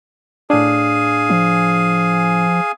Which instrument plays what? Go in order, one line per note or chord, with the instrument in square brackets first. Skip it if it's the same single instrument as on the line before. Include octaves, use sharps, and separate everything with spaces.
[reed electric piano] A2 D4 [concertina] G#4 F5 G#5
[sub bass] F3